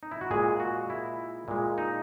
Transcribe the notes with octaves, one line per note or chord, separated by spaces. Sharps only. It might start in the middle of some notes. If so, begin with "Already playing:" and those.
D#4
E4
F#4
A#2 G#3 G#4
F#4
E4
A#2 G#3
D#4